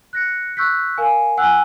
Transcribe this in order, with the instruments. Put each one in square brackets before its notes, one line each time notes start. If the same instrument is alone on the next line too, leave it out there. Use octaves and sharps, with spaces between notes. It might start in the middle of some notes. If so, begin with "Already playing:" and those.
[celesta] F#6 A#6 C#7
C#6 E6 F#6 G6 B6
A#4 F5 G#5
F#5 G#5 E6 F#6